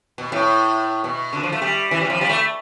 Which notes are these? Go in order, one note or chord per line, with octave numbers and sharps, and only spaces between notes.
B2
A2
B2
D3
F3
A3
G3
E3
G3
F3
G3
A3